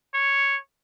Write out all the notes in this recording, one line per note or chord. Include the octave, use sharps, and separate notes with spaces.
C#5